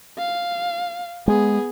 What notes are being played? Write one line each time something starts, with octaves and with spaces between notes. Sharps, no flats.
F5
G#3 B3 G#4